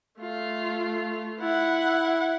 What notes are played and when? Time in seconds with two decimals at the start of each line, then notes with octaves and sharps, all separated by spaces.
0.20 A3 F4
1.40 E4 F#5